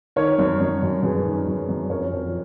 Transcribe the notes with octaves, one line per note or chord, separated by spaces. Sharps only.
D#3 A#4 C#5
F#2
F#2
F#2
F#2 G#4 B4
D#3
F#2
F#2
F2 A#4 C#5
F2